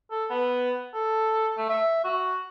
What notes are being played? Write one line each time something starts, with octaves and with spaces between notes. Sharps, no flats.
A4
B3
A4
A3
E5
F#4